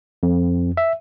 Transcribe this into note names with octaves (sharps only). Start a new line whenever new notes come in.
F2
E5